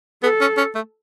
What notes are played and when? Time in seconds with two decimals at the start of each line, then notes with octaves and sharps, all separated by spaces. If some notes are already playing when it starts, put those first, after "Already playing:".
0.23 B3 A4
0.41 C#4
0.58 C#4
0.75 A3